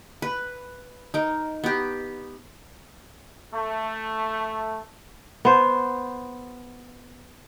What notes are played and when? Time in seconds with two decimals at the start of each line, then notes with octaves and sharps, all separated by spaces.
0.22 B4
1.14 D#4 A#4
1.64 B3 G4
3.53 A3
5.45 B3 C5